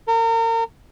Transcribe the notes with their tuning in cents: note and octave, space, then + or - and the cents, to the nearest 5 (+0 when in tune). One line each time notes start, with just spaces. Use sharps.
A#4 -35